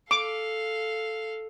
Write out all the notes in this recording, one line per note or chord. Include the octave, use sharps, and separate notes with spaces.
A4 F5 D6